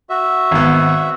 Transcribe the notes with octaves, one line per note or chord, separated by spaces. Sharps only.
F#4 E5
G#1 B3